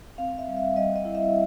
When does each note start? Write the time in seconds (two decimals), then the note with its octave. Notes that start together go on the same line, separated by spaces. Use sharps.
0.18 C4 F5
0.38 E5
0.48 G3
0.57 E5
0.76 G3 D#5
0.96 D#5
1.05 E4
1.15 E5